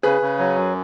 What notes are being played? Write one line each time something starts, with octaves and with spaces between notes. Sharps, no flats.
C#3 G#4 B4
C#3
F#3
F#2